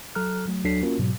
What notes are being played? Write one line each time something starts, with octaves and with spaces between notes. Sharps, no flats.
F#3 A4 A#5 F6 F#6
F#3 A3
D2 F#3 D4 A4 B6 C7
A#3 C#4 F4 F#4 A#4
G#2 B2 F#3